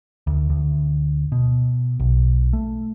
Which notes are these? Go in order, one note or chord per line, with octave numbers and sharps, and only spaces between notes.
D2
D2
B2
B1
A3